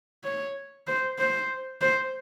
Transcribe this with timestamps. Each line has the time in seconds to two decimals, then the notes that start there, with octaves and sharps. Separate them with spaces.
0.24 C#5
0.87 C5
1.18 C5
1.81 C5